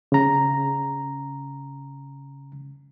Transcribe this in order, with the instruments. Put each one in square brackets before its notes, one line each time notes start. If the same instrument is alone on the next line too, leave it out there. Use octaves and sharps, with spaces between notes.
[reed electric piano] C#3 A#5